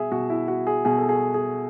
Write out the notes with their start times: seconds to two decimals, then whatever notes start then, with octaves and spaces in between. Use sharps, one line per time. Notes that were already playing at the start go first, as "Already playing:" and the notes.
Already playing: B2 G#4 E5
0.12 B2 F#4
0.30 E4
0.48 F#4
0.67 G#4
0.85 B2 G#4
0.98 A4
1.09 G#4
1.34 G#4